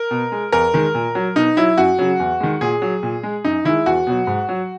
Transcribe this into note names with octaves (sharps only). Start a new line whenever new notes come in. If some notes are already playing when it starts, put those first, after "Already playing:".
Already playing: A#4
B2
G#3
E2 A#4
D#3 G#3
A#2
F#3
B2 D#4
F#3 E4
F#2 F#4
C#3 F#3
E2
D#3 G#3
A#2 G#4
F#3
A#2
G#3
F#2 D#4
D#3 G#3 E4
E2 F#4
B2 F#3
G#2
F#3